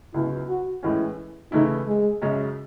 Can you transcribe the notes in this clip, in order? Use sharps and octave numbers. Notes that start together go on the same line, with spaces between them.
C#2 C#3 F#3 B3 E4
F#4
A2 E3 G#3 C#4 E4
C#3 E3 A3 D#4 E4
G#3
F#2 C#3 G#3 C#4